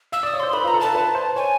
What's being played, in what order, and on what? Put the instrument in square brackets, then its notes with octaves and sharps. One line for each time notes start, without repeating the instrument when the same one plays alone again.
[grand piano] F5 [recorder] E6
[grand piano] D5 [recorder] D#6
[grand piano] C#5
[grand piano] C5 [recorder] C6
[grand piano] B4 [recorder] B5
[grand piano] F4 [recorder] A#5
[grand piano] A4
[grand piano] B4 [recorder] A5
[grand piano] B4
C5
[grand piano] C#5 [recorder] G#5